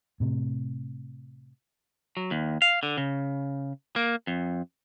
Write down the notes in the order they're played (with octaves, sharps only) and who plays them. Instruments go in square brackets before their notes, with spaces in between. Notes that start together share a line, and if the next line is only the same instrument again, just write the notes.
[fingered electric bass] A2 C3
[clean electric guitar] F#3
D#2
F5
D3
C#3
A#3
F2